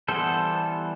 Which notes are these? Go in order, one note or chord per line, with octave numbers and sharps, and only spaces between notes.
E3 G3 B3 A4 C5